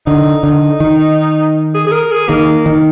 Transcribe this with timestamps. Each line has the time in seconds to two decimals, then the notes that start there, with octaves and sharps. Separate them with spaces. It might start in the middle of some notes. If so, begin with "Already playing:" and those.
0.06 D3 D#4
0.43 D3 D#4
0.80 D#3
1.74 G#4
1.87 G#4
1.92 A#4
2.11 G#4
2.29 D#3 A#3
2.66 D#3